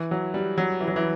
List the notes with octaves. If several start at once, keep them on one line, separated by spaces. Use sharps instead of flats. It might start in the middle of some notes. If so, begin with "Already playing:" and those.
Already playing: E3
F#3
G3
F#3
E3
F#3
E3